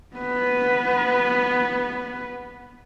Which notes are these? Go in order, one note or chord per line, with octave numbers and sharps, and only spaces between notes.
B3 B4